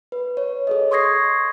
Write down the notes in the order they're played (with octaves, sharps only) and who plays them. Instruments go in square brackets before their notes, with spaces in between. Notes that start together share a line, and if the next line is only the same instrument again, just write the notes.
[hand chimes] B4
C#5
G#4 A4 D#5
C6 C#6 D#6 G#6 A#6 C7